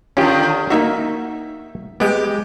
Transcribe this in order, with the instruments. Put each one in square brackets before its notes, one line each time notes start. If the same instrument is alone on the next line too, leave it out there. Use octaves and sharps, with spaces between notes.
[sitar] D3 D#3 [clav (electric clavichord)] C#4 F4 G4
[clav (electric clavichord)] A#3 D#4 F#4 [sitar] E5
[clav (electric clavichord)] G#3 B3 [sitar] G4